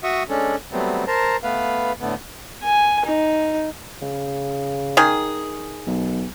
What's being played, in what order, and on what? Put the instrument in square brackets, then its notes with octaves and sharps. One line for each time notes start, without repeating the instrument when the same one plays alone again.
[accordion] F#4 E5 C#6 D#6
G#3 C#4 D4 A4
F#3 G3 A3 B3 C4
A#4 C5 A5 A#5
A3 B3 B4 F5
A2 D3 A3 B3
[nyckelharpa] G#5
D#4
[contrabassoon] C#3
[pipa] D#3 G#4
[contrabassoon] B1